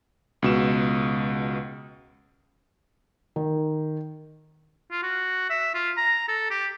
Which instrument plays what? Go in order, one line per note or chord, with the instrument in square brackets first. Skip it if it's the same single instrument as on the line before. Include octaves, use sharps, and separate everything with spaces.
[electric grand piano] C#2 B2 E7
[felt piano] D#3
[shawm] F4
F#4
E5
F4
A#5
A4
G4